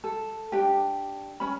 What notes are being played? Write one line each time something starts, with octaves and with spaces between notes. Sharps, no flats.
A4
D4 G4
C#4 B5